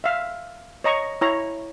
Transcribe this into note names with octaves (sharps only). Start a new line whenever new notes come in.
E5 F5
C#5 D#5 A#5 C#6
E4 C#5 A#5